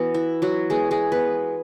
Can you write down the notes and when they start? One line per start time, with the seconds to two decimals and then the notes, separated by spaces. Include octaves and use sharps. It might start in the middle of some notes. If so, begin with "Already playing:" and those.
Already playing: E3 B3 F#4
0.14 E4
0.42 F#3 F#4
0.70 E3 G#3 B3 G#4
0.91 G#3 G#4
1.12 B3 B4